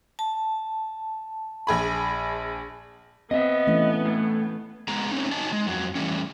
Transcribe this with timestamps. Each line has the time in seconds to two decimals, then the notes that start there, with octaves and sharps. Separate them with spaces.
0.19 A5
1.67 A#1 G#4 B5
3.31 B3 C4 D#5 E5
3.67 E3 A3 C#4
4.05 A2
4.88 G#3 B3 G#4 A#5
5.11 A3 C4 C#4 D#4
5.31 F#3 D#4 G#5 A5
5.53 G#3
5.66 F2 F#3
5.95 E3 G3 A3 C#4